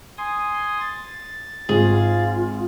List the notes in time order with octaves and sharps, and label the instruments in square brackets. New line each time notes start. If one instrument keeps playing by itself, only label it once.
[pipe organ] G#5 C6 D#6
A6
[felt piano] G#1 [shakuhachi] F4 [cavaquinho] G#4